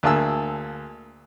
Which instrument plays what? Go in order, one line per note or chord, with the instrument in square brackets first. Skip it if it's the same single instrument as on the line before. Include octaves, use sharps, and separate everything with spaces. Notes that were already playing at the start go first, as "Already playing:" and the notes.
[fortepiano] D2 A#3 G#4 A5 E6